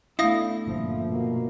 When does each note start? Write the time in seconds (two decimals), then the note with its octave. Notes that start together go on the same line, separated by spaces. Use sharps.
0.19 A3 B3 D4 E4 F5 D#6 A#6
0.67 G1 A#2 F3
1.08 B2 A#3